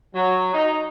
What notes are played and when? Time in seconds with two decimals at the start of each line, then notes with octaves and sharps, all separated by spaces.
0.14 F#3
0.54 D#4